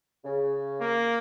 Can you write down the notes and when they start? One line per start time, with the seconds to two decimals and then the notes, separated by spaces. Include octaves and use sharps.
0.25 C#3
0.81 A#3